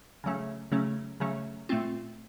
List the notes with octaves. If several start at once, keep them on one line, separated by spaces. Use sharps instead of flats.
C#3 F#3 A3 C#4
C#3 F#3 A3 C#4
C#3 F#3 A3 C#4
A#2 A3 C4 F4